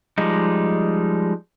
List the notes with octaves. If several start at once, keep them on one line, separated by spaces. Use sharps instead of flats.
F3 G3 G#3 D#4